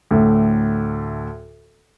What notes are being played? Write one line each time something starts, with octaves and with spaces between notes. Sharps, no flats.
D2 A2